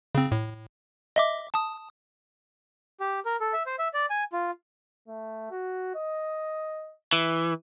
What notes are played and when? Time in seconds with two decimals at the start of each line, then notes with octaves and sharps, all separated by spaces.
0.15 C#3 C4
0.32 A2
1.16 D#5 E5 D6
1.54 A5 D#6
3.00 G4
3.25 A#4
3.40 A4
3.53 E5
3.66 C5
3.79 E5
3.94 D5
4.10 G#5
4.33 F4
5.08 A3
5.51 F#4
5.95 D#5
7.13 E3